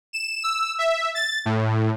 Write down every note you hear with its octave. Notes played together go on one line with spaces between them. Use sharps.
E7
E6
E5
A6
A2